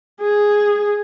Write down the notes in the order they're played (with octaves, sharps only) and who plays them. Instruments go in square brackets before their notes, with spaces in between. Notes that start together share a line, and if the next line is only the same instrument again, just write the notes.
[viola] G#4